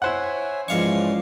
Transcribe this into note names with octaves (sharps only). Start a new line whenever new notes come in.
E4 C5 C#5 E5 F#5 G#5
G#2 E3 F3 C#4 D5 F5 C#6